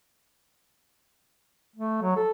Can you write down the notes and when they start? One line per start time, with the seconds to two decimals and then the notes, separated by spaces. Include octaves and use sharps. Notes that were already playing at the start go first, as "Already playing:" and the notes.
1.76 A3
2.02 F#3
2.16 A4